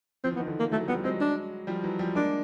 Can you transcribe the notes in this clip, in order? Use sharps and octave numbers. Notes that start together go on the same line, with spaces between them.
F3 C4
E3
B3
D#3
D3 E3
A#3
E3 F#3 A3
F3 G3 B3
F#3 G#3 C4
D4
F3 G3
E3 F#3
F3 G3
G#3 A#3 D4